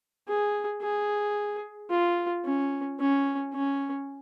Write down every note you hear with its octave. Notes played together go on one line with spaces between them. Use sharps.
G#4
G#4
F4
C#4
C#4
C#4